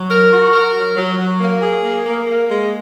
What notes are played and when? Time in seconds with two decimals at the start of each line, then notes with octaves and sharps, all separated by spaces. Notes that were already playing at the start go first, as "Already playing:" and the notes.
Already playing: F#3
0.11 A#4
0.31 F#4
0.53 A#4
0.76 F#3
0.97 F#3
1.18 F#3
1.40 A#3
1.62 G#4
1.84 A#3
2.06 A#3
2.27 A#3
2.49 G#3